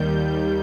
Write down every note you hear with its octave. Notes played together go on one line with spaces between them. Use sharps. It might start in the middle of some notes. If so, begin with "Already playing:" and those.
Already playing: D#2 D#3 G3 G6